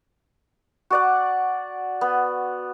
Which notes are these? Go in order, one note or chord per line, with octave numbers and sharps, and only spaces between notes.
F#4 D5 F#5
B3